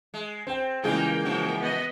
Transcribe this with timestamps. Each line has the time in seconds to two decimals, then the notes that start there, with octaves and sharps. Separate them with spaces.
0.14 G#3
0.47 C4 C5 G5
0.84 C#3 E3 G3 G#3 A#3 F4 G#4 G5
1.25 F#2 F3 F#4
1.59 B3 D#5